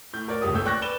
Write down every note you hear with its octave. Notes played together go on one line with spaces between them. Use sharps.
A2 G6
F#4 A#4 C#5 D5
F1 C#2 G2 G#3 G4 D#6
G1 D#2 A3 C#5 E6 G6
D5 G5 C#6 F#6 G6 A#6
B4 D5 E7 G7